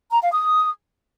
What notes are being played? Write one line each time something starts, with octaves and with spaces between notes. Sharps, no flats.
A#5
F5
D#6